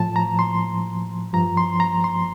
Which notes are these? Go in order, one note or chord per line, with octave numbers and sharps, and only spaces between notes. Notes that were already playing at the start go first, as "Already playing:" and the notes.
Already playing: A2 F3 A5
A#5
C6
G2 F3 A#5
C6
A#5
C6